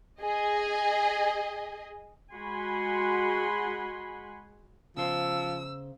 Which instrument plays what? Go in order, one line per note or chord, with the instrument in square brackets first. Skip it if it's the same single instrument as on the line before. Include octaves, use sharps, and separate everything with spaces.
[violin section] G#4 D#5
[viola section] G#3 F#4 F#5 G#5 B5 C6
[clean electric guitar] C#3 C5 [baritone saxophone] F3 [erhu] E6